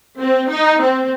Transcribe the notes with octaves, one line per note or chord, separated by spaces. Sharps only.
C4
D#4
C4